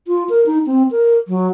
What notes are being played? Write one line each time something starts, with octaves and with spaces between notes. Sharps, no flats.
F4
A#4
D#4
C4
A#4
F#3